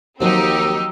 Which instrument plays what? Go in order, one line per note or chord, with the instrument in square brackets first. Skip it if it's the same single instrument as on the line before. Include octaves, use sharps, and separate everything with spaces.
[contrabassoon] D#2 [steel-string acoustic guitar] F3 F#3 [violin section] C4 D#4 G4 [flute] E6